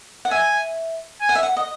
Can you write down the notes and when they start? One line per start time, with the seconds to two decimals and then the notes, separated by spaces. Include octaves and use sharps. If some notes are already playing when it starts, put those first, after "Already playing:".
0.25 F#5
0.31 E5 G#5
1.22 G#5
1.29 F#5
1.35 E5
1.43 F#5
1.57 D#5